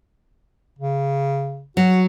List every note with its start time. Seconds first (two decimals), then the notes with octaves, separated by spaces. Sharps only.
0.79 C#3
1.77 F#3 F#4